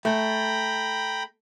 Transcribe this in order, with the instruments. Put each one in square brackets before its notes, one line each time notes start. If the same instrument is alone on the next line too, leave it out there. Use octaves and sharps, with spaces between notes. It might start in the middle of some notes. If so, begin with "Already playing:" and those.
[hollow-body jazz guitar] A3 [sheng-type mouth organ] G5 A#5 B5